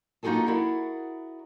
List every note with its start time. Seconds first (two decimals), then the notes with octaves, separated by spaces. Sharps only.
0.23 A#3 D#4 F4 F#4 G#4 A4
0.46 E4 F#4 G#4 A#4 D5 F#5